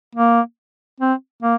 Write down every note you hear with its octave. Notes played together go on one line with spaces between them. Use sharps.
A#3
C4
A#3